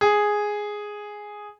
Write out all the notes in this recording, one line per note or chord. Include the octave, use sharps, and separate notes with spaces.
G#4